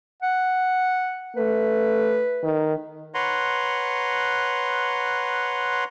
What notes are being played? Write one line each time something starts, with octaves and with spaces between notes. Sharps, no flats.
F#5
A3 B4
D#3
B4 C#5 F#5 A#5 C6